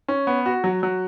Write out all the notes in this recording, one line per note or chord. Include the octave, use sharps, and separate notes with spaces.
C#4
B3
F#4
F#3
F#3